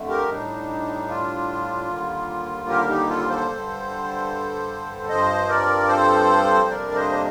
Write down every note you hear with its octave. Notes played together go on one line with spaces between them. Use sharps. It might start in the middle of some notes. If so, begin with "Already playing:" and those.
Already playing: F2 D3 A3
G4 A#4
A2 G3 D4 D#4
F4
D#2 D3 G3 A#3
G4 A#4
D#4 G4
F4 A4
A4 C5
G2 D3 G3
G2 F3 C4 C5 D#5
A#4 D5
A4 C5
F2 C3 G3 A#3 D4 A#4 D5
C5 D#5
C5